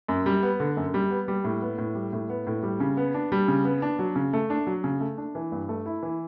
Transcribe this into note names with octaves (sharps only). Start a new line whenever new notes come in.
F#2
G3
B3
D3
F#2
G3
B3
G3
A2
B3
A2
G3
A2
B3
A2
G3
C#3
B3
D4
G3
C#3
B3
D4
F#3
C#3
A3
D4
F#3
C#3
A3
D4
E3
G2
A3
E4
E3